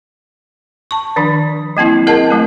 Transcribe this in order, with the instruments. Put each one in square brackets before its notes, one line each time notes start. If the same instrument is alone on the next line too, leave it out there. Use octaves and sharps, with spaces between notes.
[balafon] A5 C#6
D#3 F3 D4
F#3 A#3 C4 E4
C4 G#4 A#4 D#5 F#5 A5
F#3 A3 B3 C4